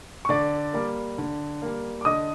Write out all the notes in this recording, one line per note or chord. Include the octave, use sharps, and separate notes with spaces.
C#6
D3 D5 D6
G3 A#3
D3
G3 A#3
D6
D3 D#5 D#6